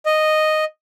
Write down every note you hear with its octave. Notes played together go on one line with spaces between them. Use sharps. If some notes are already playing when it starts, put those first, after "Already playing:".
D#5